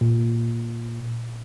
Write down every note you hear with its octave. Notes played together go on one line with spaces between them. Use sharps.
A#2